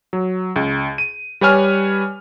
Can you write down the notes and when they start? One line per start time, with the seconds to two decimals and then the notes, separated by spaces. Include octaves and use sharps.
0.13 F#3
0.56 C#2
0.98 D#7
1.41 G3 B4 C#5 G#5 F6